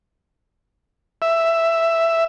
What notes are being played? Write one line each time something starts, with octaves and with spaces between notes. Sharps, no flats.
E5